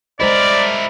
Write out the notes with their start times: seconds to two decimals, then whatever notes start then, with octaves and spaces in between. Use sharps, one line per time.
0.20 G#3 E4 A#4 C5 D5 D#5